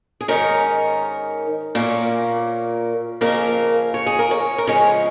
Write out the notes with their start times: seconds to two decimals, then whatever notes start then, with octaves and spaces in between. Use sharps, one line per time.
0.21 G#4
0.28 G#2 D#3 C#4 A#4
1.75 A#2 A#3 C#4
3.21 F2 C#3 A#3 C#4 A#4
3.94 C#5
4.06 G#4
4.19 A#4
4.31 C#5
4.58 A#4
4.67 C#3 F3 G#3 C#4 C#5